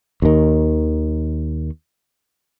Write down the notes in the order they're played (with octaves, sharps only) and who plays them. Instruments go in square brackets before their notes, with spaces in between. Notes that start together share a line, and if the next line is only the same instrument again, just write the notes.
[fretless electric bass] D#2 D#3